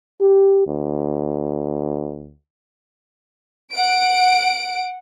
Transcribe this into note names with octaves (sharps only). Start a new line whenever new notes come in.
G4
D2
F#5 D7